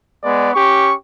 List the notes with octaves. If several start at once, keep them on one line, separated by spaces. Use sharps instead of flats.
G#3 B3 D5
C#4 G4 C#6